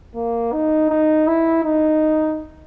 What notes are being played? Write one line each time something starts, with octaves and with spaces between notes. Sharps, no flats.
A#3
D#4
D#4
E4
D#4